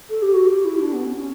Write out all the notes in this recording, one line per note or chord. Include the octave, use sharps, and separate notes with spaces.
A4
G4
F#4
G4
E4
E4
D4
B3
C#4
C#4